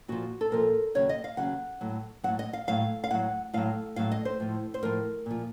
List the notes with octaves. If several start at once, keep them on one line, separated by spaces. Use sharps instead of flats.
A#2 F3 F#4
A4
A#2 F3 A#4
D#2 C#3 F#3 C#5
D#5
F5
D#2 C#3 F#3 F#5
A2 F#3
A2 F#3 F#5
D#5
F5
A2 F#3 F5
F5
A2 F#3 F#5
A2 F#3 F5
A2 F#3 F5
D#5
C5
A2 F3
C5
A2 F3 A#4
A#2 F3